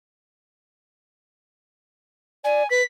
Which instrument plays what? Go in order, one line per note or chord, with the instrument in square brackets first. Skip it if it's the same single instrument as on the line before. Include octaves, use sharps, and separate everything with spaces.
[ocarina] D5 [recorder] G#5
[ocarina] B4 [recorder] B6